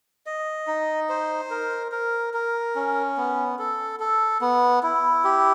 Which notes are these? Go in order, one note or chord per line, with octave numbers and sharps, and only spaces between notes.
D#5
D#4
C5
A#4
A#4
A#4
C#4
B3
A4
A4
B3
E4
G4